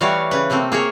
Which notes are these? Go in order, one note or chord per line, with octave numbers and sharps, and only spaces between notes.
E3 G3 A3 F#4 C#5 F5
C#3 B4
C3 A3 A#3 C4
A#3 G#4 A#4 C#5